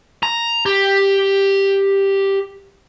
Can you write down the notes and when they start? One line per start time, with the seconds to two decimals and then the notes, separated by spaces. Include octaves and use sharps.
0.23 A#5
0.66 G4